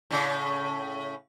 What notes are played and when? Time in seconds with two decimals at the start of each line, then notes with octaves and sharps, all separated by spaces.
0.10 A2 C#3